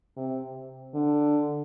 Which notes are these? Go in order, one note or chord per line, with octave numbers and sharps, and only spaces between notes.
C3
D3